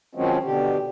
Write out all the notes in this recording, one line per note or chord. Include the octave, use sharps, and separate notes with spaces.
D#3 F3 F#3 G#3 C4 C#4
B2 D3 G4